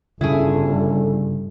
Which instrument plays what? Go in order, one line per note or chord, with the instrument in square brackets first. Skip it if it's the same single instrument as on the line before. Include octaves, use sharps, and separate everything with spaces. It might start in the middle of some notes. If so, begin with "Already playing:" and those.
[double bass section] G1 [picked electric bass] C#3 G3 C#4 [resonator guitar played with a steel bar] E4 G#4 [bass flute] A4